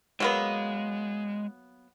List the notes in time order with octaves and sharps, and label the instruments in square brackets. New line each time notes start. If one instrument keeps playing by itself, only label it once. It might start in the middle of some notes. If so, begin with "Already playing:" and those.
[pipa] F#3 A#3 B3 [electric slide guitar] G#3